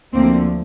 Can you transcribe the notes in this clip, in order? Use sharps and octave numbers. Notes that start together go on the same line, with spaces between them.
D2 D3 F3 A#3 C4